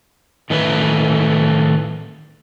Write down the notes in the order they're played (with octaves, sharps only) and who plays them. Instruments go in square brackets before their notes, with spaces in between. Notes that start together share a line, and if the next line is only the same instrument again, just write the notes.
[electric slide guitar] A2 D#3 A3 B4